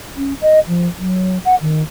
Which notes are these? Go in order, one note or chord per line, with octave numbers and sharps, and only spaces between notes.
C#4
D#5
F3
F#3
F#5
D#3